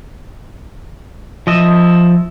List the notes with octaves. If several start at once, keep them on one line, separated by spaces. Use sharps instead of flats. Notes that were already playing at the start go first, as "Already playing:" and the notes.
F3 D#5 E5